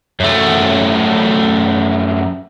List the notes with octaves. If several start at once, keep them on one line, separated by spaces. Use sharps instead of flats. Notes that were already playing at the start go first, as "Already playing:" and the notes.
F#2 A3